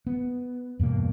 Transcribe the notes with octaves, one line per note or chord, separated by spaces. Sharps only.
B3
E2 G2 B2 A#3